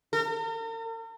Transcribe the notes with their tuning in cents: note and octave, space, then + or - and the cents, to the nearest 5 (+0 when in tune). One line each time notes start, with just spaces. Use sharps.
A#4 -45